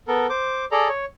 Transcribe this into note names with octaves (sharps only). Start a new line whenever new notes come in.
B3 A4 A#4
C5 D6
G#4 A4 D5 A#5
C#5